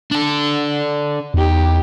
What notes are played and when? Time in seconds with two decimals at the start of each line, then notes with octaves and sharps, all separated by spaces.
0.11 D4 A4
1.34 E2 D#4 G4